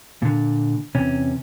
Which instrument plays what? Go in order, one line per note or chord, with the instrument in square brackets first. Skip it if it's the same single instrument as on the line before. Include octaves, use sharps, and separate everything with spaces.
[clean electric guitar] A#2 D3
E2 C3 C#4